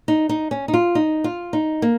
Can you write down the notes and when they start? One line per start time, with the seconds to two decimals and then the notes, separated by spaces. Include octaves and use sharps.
0.08 D#4
0.29 D#4
0.51 C#4
0.68 D#4
0.74 F4
0.95 D#4
1.24 F4
1.53 D#4
1.82 A#3